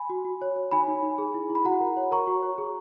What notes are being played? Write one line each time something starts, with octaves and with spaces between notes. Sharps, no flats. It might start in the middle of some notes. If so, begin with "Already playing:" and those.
Already playing: G#5 B5
F#4
F#4
C#5
C#5
D#4 G#5 B5
D#4
D#4
G#4
E4
E4
B5
F#4 F#5 A#5
A#4
C#5
A#4 A#5 C#6
F#4
C#5
G#4